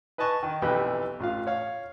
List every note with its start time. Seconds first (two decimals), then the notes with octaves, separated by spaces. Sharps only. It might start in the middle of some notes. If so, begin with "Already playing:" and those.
0.18 B4 D#5 G#5 A5 C#6
0.43 D#3
0.62 B1 F2 E3 G4 B4
1.20 A1 F4 F5
1.47 C#5 F5